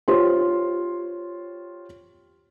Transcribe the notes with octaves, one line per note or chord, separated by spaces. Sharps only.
F4 G4 C5 C#5 C6